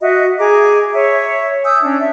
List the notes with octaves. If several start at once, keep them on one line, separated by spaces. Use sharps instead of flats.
F#4 D#5 E5
G#4 A#5 D6
C#5 E5
G#5 D#6 E6 G6
C#4 D4
E5